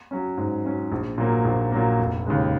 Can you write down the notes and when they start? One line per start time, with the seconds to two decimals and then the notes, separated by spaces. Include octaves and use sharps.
0.11 F#3 C#4
0.38 G#2
0.65 F#3 C#4
0.92 A#1
1.18 A#2 F#3 A#3
1.45 A#1
1.72 A#2 F#3 A#3
1.99 F1
2.26 D#2 C#3 G#3